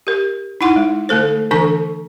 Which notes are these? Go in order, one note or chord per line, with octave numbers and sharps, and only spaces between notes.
G4 A#4
D#4 E4 F#5 C6
G#3
D3 A3 A4 C5
D3 E3 D4 A4 C#6